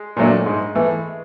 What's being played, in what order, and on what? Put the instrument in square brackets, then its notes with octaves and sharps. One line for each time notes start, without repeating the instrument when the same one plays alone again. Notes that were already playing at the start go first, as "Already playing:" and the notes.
Already playing: [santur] G#3
[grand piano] A#2 F#3 A3 D4
G#2
E3 A3